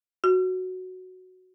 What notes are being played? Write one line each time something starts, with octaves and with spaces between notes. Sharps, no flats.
F#4